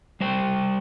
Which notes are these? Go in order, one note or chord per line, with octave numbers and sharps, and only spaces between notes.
G3 C5 G5